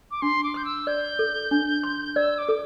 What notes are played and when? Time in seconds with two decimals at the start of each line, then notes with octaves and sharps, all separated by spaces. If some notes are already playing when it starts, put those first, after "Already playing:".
0.11 D6
0.22 D4 C6
0.44 D6
0.54 C6 G6
0.65 E6
0.87 D5 G6
1.19 A4
1.51 D4
1.83 C6
2.16 D5 E6
2.38 D6
2.49 A4